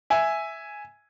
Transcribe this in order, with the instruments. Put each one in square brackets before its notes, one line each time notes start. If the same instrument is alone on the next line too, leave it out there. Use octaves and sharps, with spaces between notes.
[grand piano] E5 G#5